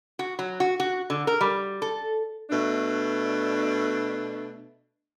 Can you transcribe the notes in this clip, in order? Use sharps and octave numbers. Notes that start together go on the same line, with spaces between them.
F#4
F#3
F#4
F#4
D3
A#4
G3
A4
B2 A3 D4